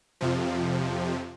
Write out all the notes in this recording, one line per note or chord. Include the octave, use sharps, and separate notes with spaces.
F2 C3 F3